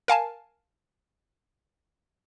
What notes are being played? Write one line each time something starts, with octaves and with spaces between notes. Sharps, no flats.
A#4 F5 G#5 A5